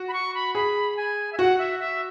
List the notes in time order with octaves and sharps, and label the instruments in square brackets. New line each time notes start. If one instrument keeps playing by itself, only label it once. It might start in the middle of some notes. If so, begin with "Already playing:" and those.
Already playing: [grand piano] F#4
[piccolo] B5
C#6
B5
[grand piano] G#4 [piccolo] B5
[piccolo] G#5
E5
[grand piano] F#4 [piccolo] F#5
[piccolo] E5
E5